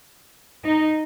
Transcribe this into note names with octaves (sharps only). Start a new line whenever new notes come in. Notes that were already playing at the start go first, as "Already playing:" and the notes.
D#4